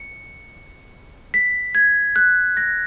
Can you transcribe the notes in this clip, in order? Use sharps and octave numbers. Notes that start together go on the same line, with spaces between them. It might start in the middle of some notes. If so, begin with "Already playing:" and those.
Already playing: C#7
B6
G#6
F#6
A#6